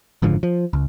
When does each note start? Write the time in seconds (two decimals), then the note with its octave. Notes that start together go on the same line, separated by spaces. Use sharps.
0.22 F#1 G#2 D3 F3
0.43 F3
0.73 C#2